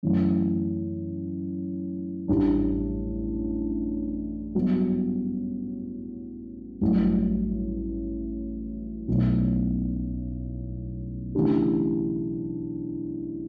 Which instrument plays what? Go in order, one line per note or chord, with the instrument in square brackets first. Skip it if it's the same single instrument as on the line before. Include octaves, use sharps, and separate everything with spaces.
[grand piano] F#2 E3 A3
A1 A2 G3 D4
G2 F#3 B3 F#4
A1 G2 F#3 A3
B1 B2 A3
C#3 E3 A3 D4 G4